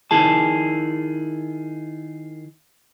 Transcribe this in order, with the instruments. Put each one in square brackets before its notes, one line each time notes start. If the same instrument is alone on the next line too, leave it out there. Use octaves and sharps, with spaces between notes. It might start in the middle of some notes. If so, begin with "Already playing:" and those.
[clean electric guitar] D#3 E4 G#4 A5